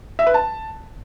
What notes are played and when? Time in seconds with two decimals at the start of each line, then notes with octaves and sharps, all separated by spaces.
0.19 E5
0.27 B4
0.34 A5